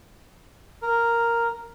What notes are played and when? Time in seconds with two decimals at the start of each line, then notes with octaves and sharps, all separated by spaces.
0.82 A#4